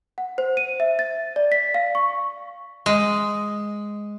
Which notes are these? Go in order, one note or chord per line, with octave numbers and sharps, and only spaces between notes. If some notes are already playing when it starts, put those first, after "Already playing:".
F#5
C5
D#7
E5
A6
D5
B6
F5
C#6
G#3